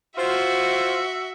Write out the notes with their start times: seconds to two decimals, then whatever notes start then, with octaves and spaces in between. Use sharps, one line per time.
0.18 F4 F#4 C5 E5